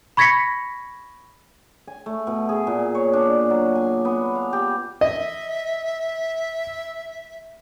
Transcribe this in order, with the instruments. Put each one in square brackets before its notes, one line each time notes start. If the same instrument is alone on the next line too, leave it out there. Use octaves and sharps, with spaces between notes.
[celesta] B5 C#6 G#6 A#6 B6 C#7
[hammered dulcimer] G#5
A3
B2
G#4
A#2
C#5
D4
F#3
G#5
B3
F5
G4
[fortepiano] D#5 [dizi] E5